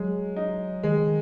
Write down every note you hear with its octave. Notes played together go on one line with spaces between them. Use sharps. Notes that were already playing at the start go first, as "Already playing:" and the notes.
Already playing: F#3 G#3
D#4
D#3 G#3
D#3